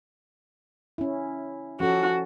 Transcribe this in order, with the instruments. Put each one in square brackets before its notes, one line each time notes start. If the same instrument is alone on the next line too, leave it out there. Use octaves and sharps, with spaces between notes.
[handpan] C#4 E4
[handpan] F3 C#4 A4 [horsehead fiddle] F#4